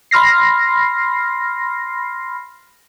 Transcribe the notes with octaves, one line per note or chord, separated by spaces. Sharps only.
B5 C6 F6 A#6 C7